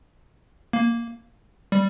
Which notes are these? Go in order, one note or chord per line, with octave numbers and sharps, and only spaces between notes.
A#3
G3